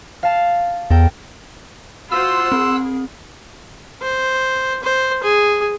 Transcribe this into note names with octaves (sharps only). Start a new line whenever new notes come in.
F5 A5
E2 A4 A#4 G5
F4 F#4 C5 F#5 C6 E6
C4 G#4
C5
C5
G#4